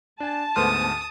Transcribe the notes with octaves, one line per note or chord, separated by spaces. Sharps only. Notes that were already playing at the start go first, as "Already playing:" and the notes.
D4 G#5 A5
D2 G#2 A3 B3 C5 D#6 F6